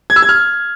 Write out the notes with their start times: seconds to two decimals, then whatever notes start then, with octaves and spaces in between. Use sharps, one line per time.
0.10 G#6
0.16 E6
0.22 G#6
0.29 F6